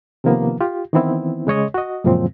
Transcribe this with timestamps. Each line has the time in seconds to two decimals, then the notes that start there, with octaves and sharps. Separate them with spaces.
0.24 C3 D#3 F3 A#3 B3
0.61 F4 G4
0.93 D#3 E3 B3 C4 E4
1.47 C#3 G#3 C#5 D#5
1.74 F#4 D#5
2.04 F#2 A#2 C#3 F3 G#3 C4